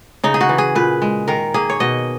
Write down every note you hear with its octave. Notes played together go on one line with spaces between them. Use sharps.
C#3 D#4
G#4
F#4
E3
G#4
A#2 B4
G#3
D#3 A#4
A#3 G#4
C#5
B2 D#5